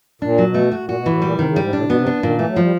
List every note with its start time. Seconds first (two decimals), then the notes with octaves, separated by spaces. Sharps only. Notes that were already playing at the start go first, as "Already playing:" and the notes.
0.22 A#2 D4
0.38 F#3
0.46 B2
0.54 A3
0.72 F#4
0.84 A#2 F#4
0.97 B2
1.06 A2 E3
1.22 A#2 G3
1.34 C3 D#3
1.47 C#3
1.56 G#2 G3
1.73 A2 D4
1.79 C3
1.85 B2 B3
1.97 C3
2.06 D4
2.23 A#2 D#3
2.35 E3 A3
2.48 F#3
2.56 F3 G3